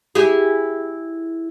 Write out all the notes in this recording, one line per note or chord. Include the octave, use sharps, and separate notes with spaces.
E4 G4 G#4